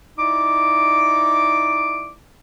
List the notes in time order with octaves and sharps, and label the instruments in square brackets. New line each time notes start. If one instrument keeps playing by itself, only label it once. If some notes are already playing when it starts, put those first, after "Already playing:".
[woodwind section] D#4 E4 D5 D6